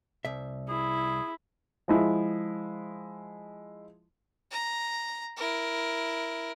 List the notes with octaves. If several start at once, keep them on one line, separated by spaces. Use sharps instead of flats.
C2 E5
E4 G#4
F3 G#3 E4
A#5
E4 A#4